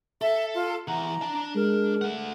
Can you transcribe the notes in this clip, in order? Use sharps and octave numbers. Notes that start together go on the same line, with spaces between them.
A4 E5
F4
E3 F#5 A#5
D4 A5
G#3 A#4
A3 F#5